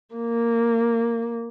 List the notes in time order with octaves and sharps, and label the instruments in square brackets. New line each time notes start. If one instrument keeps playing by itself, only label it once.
[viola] A#3